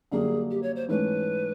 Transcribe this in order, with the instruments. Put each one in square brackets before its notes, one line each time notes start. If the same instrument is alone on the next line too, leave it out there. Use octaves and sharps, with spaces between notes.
[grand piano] F#2 D3 G3 A#3 D4 [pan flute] G#4
[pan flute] G4
C#5
C5
[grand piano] G#2 E3 A3 C#4 [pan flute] B4